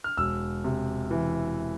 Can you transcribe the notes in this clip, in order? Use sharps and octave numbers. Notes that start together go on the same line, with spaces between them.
F6
E1 E6
C3
E3